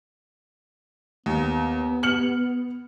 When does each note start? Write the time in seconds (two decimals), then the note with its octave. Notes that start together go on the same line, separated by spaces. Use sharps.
1.26 D#2 B3
2.03 F6 C#7 F#7